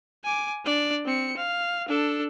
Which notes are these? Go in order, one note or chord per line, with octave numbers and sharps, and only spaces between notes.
G#5 D6
D4 D5
C4 C#7
F5
D4 A4